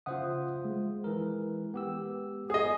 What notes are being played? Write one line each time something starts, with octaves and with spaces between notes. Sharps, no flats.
C#3 F4 C5 E5 F#5 D#6
G#3
E3 A#4
B3 G4 E6
G#4 D#5 D#6